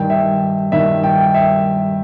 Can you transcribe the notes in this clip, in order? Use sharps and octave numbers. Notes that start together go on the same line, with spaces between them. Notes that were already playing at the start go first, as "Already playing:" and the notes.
Already playing: G2 D#3 G5
E5
G2 D#3 E5
G5
E5